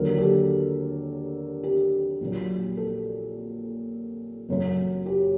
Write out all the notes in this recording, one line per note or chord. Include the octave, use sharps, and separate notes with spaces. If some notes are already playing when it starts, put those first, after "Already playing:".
Already playing: D#2 D3 F#3 A#4
G4
A4
G4
A#1 A#2 F#3
A4
F#1 F#2 F#3
G4